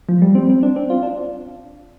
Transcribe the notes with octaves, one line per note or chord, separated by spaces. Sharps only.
F3
G3
C4
C4
D4
C4
F4
D4